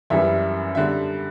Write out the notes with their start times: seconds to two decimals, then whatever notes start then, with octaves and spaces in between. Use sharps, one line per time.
0.10 F#2 E3 G3 E5
0.75 D3 G3 E5